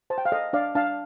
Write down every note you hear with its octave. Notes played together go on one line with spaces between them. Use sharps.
C5 A5
G5
F5
A4 D#5
D4 D5 F5
D4 F5 A5